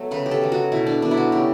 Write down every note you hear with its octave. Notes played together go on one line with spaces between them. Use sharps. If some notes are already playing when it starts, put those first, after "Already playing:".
Already playing: F#3 A3 B3
C#3 B4
G4
A4
F#3 A3
F#4
B2 E4
D4
F#3 B3 D4
E4
F#4
C#3 G4